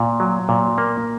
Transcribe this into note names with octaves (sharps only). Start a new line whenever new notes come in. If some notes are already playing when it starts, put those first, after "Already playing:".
Already playing: A#2
F#3
A#2
A#3